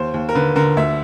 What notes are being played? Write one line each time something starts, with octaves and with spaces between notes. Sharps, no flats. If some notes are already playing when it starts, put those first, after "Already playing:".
Already playing: D#2 C5
D#2
A#4
D3 B4
D3 A#4
D2 E5